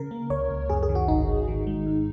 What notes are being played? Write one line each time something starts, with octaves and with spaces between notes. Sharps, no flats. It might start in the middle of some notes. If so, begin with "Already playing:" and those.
Already playing: C#3 A#4
A#3
C#2 C#5
C#2
F#2 G#4
G#4
D#3
F#4
G#1 D#4
G#1
D#3
G#3
G#2